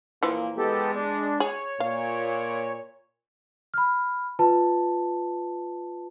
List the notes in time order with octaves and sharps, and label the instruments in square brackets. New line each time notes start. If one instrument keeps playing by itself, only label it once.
[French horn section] A#2 A#3 [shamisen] E3 F3
[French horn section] G#3 [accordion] B3 G4 A4
[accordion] D4
[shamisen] G#4 [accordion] C#5
[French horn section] A#2 [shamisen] F5
[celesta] B5 F6
F4 B4 A5